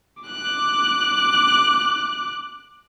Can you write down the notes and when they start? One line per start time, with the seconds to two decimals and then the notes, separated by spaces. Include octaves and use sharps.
0.23 D6 F#6